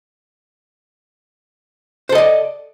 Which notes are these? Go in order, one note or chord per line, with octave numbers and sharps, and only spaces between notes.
A4 C5 D5 D#5